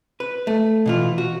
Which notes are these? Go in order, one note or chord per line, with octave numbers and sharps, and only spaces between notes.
B4
A3
B2 E3 F4
F#4